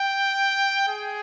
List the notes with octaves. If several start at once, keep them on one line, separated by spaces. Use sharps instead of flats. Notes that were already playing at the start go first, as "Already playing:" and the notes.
Already playing: G5
G#4